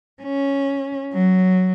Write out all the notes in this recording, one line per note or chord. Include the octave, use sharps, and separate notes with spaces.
C#4
F#3